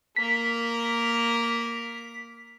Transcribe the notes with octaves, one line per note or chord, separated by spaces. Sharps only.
A#3 A#4 B6